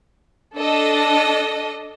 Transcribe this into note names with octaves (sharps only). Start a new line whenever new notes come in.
D4 A4 D#5